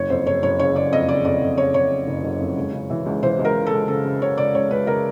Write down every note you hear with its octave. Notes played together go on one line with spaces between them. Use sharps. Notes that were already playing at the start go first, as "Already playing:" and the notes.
Already playing: F#1 C#5
F2 C5
F#1 C#5
F#1 C#5
C#3 C#5
C#3 D5
F2 D#5
C#3 D5
F2 D5
F2
C#3 C#5
F2 C#5
C#3
F#1
F#1
F2
C#2
C#3
E3
C#2
E3 C5
C#2
A#4
C#3
A4
C#2
C#3 A4
C#3
C#3 C#5
C#2 D5
C#2 C#5
C#2 B4
C#3 A#4